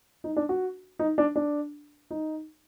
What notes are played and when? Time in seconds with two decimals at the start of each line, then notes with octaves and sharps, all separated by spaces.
0.24 D#4
0.36 D4
0.49 F#4
0.99 D#4
1.18 D4
1.36 D4
2.11 D#4